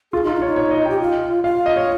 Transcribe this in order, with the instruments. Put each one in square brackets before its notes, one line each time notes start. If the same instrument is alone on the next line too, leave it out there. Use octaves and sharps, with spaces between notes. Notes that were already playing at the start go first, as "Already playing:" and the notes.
[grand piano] F4 [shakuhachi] G#4
[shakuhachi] D#4
[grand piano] F4
[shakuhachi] D#4
[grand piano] C#5
[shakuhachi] D#4
[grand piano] C#5
D#5
[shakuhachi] G4 [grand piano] G5
[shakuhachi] F4
[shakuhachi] F4 [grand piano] F5
[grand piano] D#5
C#5